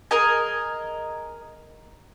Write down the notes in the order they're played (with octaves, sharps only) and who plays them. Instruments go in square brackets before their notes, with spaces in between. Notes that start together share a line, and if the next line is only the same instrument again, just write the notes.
[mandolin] G#4 A#4 D#5 G#5